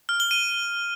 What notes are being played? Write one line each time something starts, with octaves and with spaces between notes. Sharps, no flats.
F6
G7
D#7